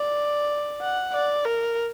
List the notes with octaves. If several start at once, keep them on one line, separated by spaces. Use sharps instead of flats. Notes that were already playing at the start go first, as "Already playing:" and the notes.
Already playing: D5
F#5
D5
A#4